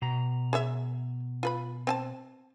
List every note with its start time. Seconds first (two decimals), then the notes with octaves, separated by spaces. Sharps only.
0.02 B2 A#5
0.53 G#4 C#5 E5
1.43 F4 B4 B5
1.87 C4 G#5 A5